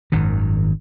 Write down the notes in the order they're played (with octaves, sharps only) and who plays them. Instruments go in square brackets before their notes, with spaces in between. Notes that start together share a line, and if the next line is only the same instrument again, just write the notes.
[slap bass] G#1 F#2 D#3